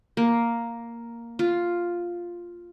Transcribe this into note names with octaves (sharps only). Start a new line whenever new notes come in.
A#3
F4